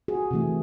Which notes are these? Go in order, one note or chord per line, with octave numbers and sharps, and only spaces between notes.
F#4 G#4
C3 E3 A3